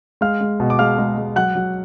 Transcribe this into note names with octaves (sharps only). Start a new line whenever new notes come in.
G#3 F5 F6
G#3
B2
D6
G#3 F5 F6
G#3
G#3
F#3 F#5 F#6
F#3